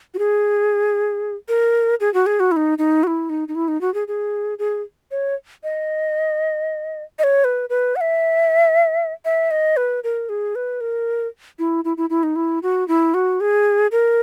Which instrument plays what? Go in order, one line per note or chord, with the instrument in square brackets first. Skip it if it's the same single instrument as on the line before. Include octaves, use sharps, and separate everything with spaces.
[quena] F#4
G#4
A#4
G#4
F#4
G#4
F#4
E4
D#4
D#4
F#4
E4
D#4
D#4
E4
D#4
F#4
G#4
G#4
G#4
C#5
D#5
D#5
C#5
B4
B4
F#5
E5
E5
D#5
B4
A#4
G#4
B4
A#4
E4
E4
E4
E4
D#4
E4
F#4
E4
F#4
G#4
A#4